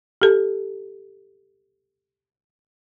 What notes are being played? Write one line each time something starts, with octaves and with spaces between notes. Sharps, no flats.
G4 A4